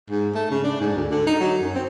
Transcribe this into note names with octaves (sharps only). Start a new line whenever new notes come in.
G#2
A3
C#3
D4
G#2
D2
D3
D#4
F#3
F#2
C4